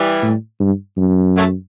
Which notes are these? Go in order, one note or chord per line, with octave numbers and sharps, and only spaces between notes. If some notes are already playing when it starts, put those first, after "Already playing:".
Already playing: E3 G3
A2
G2
F#2
F#3 A3